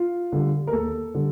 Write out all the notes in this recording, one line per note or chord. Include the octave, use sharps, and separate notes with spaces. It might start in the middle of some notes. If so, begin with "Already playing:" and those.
Already playing: F4
D3 G3
A#4
D#2 A4
D3 G3